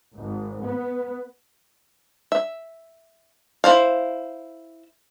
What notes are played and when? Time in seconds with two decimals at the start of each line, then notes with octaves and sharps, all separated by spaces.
0.17 G#1
0.64 B3
2.32 E5
3.64 E4 C5 F5